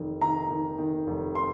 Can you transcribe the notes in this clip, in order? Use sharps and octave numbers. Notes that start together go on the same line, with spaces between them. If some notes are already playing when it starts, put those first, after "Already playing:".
Already playing: F1 D#3
D#3 A#5
D#3
D#3
F1
C6